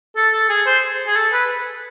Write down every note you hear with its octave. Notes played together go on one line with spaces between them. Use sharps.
A4
A4
G#4
C5
G#4
A4
B4